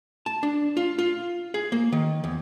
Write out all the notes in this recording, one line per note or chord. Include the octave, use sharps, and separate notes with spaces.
A5
D4
F4
F4
G#4
A#3
D#3
E2